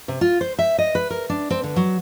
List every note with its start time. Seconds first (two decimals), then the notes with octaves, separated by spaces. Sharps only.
0.08 C3
0.21 F4
0.41 C5
0.59 E5
0.78 D#5
0.95 B4
1.10 A#4
1.30 D4
1.50 C4
1.64 D3
1.76 F#3